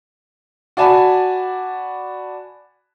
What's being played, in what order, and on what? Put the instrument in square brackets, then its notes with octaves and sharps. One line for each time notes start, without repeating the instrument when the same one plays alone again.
[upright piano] F#4 D5 G#5 A5 B5